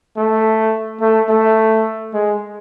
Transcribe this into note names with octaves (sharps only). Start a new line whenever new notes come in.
A3
A3
A3
G#3